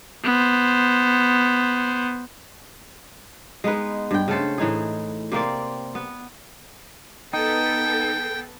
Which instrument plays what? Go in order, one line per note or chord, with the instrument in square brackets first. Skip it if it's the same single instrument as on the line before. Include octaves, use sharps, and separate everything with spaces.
[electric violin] B3 C5
[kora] G#3 B3 D#4 B4
G2 G5
C#3 A3 A4 C5
A2 E3 D#4 G#4
C3 A#3 C4 D5
B3
[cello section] B3 A4 [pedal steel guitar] D#4 [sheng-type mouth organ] G5